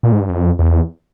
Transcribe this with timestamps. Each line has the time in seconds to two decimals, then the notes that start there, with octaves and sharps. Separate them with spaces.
0.03 A#2
0.12 G#2
0.20 G2
0.29 F2
0.59 E2